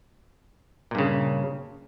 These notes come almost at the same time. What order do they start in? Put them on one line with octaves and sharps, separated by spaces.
A#2 G2 C#3